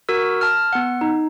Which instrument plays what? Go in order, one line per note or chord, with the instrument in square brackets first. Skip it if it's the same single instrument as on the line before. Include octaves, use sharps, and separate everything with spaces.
[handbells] F#4 A#4 E6
A5 F6
B3 F#5
D#4